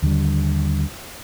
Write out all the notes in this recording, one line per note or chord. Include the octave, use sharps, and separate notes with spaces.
D#2 D3 E3 G3